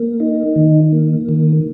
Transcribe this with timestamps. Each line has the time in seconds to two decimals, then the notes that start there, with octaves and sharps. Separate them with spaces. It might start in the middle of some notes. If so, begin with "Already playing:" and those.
Already playing: A#3
0.20 D#4
0.56 D#3
0.92 A#3
1.29 D#3